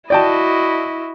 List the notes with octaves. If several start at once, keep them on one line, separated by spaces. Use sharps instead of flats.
E4 F#4 D5 D#5 G5 A5